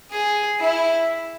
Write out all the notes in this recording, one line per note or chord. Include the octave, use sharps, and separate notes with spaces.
G#4
E4